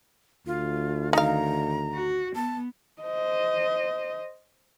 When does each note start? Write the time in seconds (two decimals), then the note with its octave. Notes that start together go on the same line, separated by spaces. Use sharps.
0.46 D2 F4
1.13 D#3 D#4 F5 A#5
1.94 F#4
2.35 B3 A5
3.02 C5 D#5